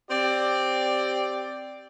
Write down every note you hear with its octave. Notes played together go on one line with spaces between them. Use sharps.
C4 G4 D5